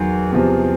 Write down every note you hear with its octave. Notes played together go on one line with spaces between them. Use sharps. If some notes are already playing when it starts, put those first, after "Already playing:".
Already playing: E2 D#3 F#3
E2 C3 F3